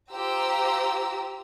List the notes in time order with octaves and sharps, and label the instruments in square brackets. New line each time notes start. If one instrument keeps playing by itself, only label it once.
[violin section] F4 G4 C5 A#5 E6